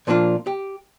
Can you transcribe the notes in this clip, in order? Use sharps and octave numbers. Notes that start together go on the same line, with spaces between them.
A#2 F3 A#3 D4 F4
G4